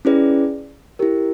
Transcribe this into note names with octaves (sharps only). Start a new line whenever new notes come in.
C#4 E4 G#4 B4 D5
E4 G4 A#4